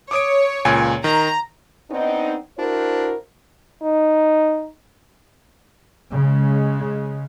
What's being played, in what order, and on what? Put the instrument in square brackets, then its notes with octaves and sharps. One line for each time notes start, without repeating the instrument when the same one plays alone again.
[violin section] C#5 [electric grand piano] D6 D#6 D7
[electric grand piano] C#2 A#2 G#5
[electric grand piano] D#3 [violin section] A#5
[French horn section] B3 C4 D4 D#4
D4 E4 F#4 A#4 C5
[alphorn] D#4
[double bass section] C#3 G#3